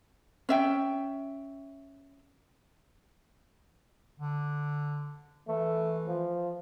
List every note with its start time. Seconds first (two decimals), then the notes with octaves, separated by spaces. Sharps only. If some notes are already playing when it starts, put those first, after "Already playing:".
0.49 C#4 E5 G5
4.20 D3
5.48 E3 A3
6.07 F3